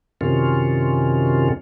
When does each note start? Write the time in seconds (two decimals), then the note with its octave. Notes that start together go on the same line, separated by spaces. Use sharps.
0.21 F#2 C3 D#3 C#4 F4